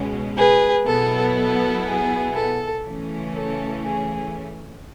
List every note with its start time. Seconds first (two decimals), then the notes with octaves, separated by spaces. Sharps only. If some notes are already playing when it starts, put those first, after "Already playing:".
Already playing: C#2 B2 G#3 C#4
0.37 G#4 B4
0.87 B2 F#3 B3 E4 A4
1.37 A4
1.87 G#4
2.35 A4
2.85 C#3 E3 A3 C#4
3.34 A4
3.85 G#4